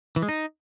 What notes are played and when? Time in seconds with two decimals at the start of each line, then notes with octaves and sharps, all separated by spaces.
0.16 E3
0.22 G#3
0.29 D#4